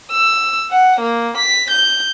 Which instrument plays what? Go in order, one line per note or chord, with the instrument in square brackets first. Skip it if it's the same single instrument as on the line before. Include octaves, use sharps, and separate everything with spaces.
[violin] E6
F#5
A#3
B6
G6